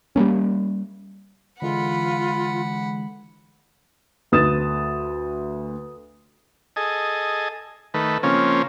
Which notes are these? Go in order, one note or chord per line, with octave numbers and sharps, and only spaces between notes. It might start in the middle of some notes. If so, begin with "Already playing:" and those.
G3 G#3 A#3 C#4
D3 E3 G#3 F4 F#5 B5
D2 B4 D#6 A6 E7
G#4 A4 D#5
D#3 A3 B4
C#3 F3 A#3 C4 C#4